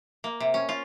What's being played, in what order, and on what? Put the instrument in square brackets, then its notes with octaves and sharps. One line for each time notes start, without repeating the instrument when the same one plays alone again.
[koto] A#3
C3
C#4
F4